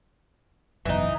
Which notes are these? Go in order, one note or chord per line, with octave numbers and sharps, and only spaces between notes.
F#1 B1 E2 E3 D#4